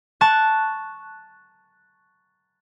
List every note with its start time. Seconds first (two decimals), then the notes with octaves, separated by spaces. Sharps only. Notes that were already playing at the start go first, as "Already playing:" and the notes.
0.21 A5 C#6 F#6